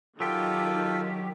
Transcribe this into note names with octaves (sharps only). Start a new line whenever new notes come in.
D#3 F#3 F4 G4 A4